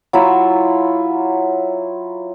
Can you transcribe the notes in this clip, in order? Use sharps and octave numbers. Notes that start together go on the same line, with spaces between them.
F#3 E4 F4 E5